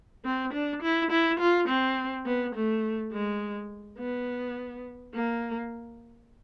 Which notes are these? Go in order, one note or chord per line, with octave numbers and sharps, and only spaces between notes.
C4
D4
E4
E4
F4
C4
B3
A3
G#3
B3
A#3